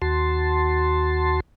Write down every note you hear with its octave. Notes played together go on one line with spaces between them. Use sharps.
D#2 F#4 A5 C6